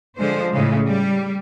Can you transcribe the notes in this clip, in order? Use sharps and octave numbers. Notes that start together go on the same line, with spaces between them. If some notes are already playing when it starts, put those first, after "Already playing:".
D3 F3 G#3 C5
A2 C#3 G#3
G3